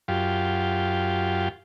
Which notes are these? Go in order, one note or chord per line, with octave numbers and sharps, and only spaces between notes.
F#2 F4 G4